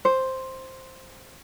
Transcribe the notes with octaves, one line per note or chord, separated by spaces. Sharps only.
C5